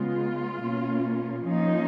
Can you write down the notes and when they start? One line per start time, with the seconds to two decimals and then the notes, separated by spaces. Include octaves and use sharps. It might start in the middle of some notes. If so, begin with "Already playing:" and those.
Already playing: C#3 G#3 B3 F4
0.60 B2 A#3 C#4
1.44 F3 A#3 C#4 D#4